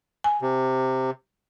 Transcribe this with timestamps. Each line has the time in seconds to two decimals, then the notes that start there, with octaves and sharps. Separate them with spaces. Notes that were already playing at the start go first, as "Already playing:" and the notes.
0.24 G#5
0.42 C3